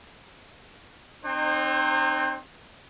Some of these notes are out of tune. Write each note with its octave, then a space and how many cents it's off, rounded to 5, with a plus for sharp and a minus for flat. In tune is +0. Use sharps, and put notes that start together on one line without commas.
C4 +0 D#4 -35 C5 +35